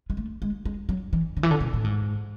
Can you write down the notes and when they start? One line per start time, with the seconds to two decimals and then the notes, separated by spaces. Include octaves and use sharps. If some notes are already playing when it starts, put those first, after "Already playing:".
0.10 G#3
0.17 A3
0.42 G#3
0.65 G#3
0.89 F#3
1.13 E3
1.37 D3
1.43 E3
1.51 D3
1.60 B2
1.73 A2
1.84 G#2